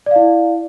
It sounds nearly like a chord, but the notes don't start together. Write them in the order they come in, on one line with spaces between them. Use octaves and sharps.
D5 F5 E4